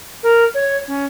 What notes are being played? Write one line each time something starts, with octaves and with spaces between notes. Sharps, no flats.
A#4
C#5
C#4